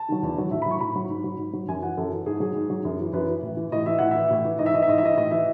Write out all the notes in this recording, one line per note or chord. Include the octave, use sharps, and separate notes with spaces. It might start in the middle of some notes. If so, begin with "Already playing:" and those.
Already playing: A5
D#3 F#3
E2
D#3 F#3
A2 E5
B5
F#3 C#6
A2 B5
F#3
G#2
F#3
G#2
F#3
F#2 G#5
E3 F#5
F#2 A4
E3
G#2 G#4
F#3 G#4
G#2
F#3
F#2
E3
F#2 B4
E3
A2
E3
A2 D#5
E3 E5
A2 F#5
E3 E5
A2
E3
G#2 D#5
E5
E3 D#5
E5
G#2 D#5
E5
E3 D#5
A2 D#5
E3 E5